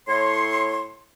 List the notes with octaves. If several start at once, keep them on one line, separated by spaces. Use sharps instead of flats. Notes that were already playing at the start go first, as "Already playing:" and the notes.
A2 C#5 C6